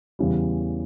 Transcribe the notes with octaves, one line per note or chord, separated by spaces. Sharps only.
E2 C#3 E3 G3